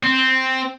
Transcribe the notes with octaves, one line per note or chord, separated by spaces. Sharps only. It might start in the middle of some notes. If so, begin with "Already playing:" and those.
C4